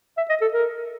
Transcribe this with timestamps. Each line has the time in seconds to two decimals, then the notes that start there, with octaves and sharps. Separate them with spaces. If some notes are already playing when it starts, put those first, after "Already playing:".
0.17 E5
0.29 D#5
0.41 A4
0.53 A#4